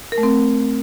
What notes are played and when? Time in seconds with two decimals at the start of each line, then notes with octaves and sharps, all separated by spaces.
0.12 A#4
0.18 A3
0.23 C4